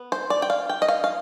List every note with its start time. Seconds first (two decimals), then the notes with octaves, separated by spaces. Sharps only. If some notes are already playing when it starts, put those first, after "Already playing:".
Already playing: B3
0.12 C5
0.30 D5
0.42 G5
0.50 F5
0.69 G5
0.82 D#5
0.88 F5
1.04 F5